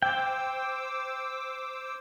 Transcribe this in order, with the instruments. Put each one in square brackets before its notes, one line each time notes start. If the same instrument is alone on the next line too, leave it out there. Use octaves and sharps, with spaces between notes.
[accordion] C5 D6 E6 [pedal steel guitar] G5